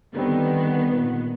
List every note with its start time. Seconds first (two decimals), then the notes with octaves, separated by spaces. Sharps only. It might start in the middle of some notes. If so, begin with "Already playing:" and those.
0.14 D3 D#3 G3 B3 C4
0.93 A#2